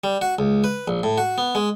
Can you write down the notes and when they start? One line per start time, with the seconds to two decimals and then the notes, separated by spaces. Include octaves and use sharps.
0.04 G3
0.21 F#4
0.39 C#2
0.64 B4
0.88 A#1
1.03 A2
1.18 F#4
1.38 B3
1.55 G#3